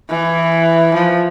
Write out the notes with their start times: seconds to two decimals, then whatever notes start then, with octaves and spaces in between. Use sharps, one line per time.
0.10 E3
0.94 F3